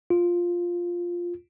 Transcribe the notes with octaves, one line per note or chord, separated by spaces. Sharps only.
F4